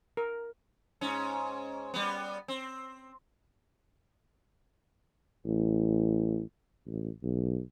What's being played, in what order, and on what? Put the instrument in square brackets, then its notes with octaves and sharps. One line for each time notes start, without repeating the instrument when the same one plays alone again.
[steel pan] A#4
[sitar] G#2 C#4
G3 B3
C4
[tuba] A1
A1
B1